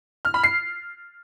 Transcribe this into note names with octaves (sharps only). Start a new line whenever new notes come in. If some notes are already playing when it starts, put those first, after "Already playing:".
F6
B5
C7